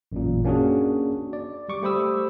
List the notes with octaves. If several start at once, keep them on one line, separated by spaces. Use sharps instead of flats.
A1 F#2 A#2
A#3 C#4 D4 F#4 G#4
D5
G3 C#6 D6
A3 G4 C5 B5 D#6 E6